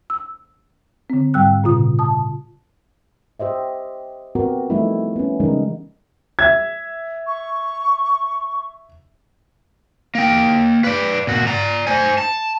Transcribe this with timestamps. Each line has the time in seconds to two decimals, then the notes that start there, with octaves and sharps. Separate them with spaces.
0.10 E6
1.10 D3 C4
1.34 G#2 G3 G5 E6 F#6
1.64 A#2 C#3 F4 D#6
1.99 A5 D#6
3.40 G4 C5 D#5 E5
4.35 B3 C4 F#4 G4 A#4
4.70 F3 G3 A3 B3 D#4 E4
5.16 B3 C#4
5.40 C#3 E3 G3 G#3 D#4 A#4
6.39 E5 G#6
7.26 C#6
10.15 A#3 G5
10.84 B4 D5
11.27 A#2 F#4
11.47 D5 A#5
11.87 C5 G#5
12.18 A5